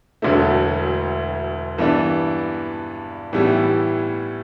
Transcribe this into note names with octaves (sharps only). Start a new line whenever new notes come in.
E1 D2 D3 F#3 A3
G2 E3 B3 D4
A2 E3 G3 B3